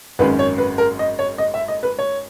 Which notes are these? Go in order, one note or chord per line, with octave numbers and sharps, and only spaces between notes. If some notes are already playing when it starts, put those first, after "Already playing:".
G#1 F#2 D#3 G#3 C#4 B4
C#5
B4
A#4
D#5
C#5
D#5
E5
D#5
B4
C#5